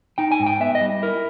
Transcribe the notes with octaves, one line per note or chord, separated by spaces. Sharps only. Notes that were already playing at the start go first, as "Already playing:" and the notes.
D#4 G5
G#5
G#2
G5
B3 E5
D#5
G3
E4 A#4